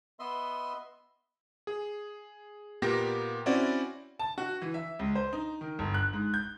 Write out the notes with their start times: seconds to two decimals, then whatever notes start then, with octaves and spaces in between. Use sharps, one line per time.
0.19 B3 D#5 E5 C6
1.67 G#4
2.82 A#2 A#3 B3 G4 A#6
3.46 C4 C#4 E4 F#4 D5
4.19 A5
4.38 F#4
4.62 E3
4.74 E5
4.99 C#2
5.15 C5
5.33 D#4
5.61 D#3
5.79 G1
5.94 F#6
6.13 G#2
6.34 G6